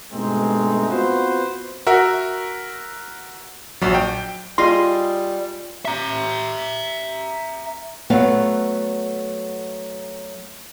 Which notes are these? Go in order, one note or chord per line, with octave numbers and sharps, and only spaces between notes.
G2 B2 G#3 A3 C4 D#4
B3 C4 F4 F#4 B4 C5
F#4 A#4 E5
A#1 F#3
G5
G3 F4 G#4 D#5 C6
E5 A#5
F#3 A3 B3 F5